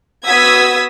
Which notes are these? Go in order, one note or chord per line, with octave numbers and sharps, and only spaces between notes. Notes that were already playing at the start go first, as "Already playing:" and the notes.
B3 F#4 D#6 E6 G#6 B6